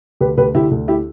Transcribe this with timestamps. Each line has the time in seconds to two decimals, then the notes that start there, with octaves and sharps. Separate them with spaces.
0.21 D2 G4 B4
0.37 D2 G4 B4
0.54 D2 E4 G4
0.71 D2
0.88 E4 G4